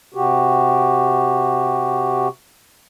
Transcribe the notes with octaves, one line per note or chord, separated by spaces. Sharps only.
C3 F#4 G4